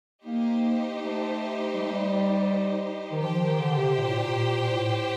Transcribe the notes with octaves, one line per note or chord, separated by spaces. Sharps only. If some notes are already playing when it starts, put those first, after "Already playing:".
A#3 D#4 G4 C5
A3
G3
A3
G3
D#3
F3 G4 C5 G5
D#3
D3
D3
C3
A#2
A2
A#2
A#2
A2